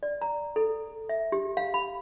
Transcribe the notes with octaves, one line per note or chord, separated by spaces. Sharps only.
D5
A#5
A4
E5
G4
F5
B5